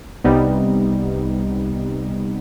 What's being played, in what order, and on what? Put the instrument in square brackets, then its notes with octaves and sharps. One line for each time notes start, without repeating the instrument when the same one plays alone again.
[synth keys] C2 C3 G3 B3 D#4